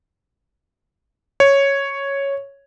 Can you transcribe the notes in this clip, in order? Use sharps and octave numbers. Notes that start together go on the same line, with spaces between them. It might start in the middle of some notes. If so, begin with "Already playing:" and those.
C#5